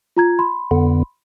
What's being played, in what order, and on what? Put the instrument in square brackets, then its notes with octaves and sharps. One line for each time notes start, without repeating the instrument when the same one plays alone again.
[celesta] F4 A#5 G#6
B5 C6
[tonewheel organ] F2 D3 B3